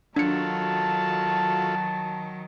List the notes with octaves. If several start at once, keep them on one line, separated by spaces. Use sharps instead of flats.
D#3 F#3 D4 F4 F#4 A4 A5 C#7